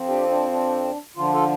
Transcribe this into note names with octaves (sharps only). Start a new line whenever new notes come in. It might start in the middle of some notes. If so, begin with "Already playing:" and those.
Already playing: F2 F3 C4
D4 G4
D4
D4
D3 F3 D4 F4
F4 A4